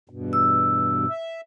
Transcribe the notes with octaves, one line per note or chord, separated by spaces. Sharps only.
E2 G2 B2
E6
E5